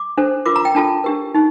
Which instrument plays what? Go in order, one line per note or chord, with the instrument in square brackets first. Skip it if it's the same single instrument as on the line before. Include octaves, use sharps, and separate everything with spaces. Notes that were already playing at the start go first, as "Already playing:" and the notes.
Already playing: [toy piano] D6
D4 A4 C5
F4 A#4 D6
A#5
G5
D4 F4 A4 A5
D4 G4 A#4
D#4 G4